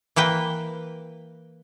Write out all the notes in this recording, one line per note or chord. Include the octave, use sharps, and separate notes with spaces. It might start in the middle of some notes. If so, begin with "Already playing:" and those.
E3 A#3 B4 G5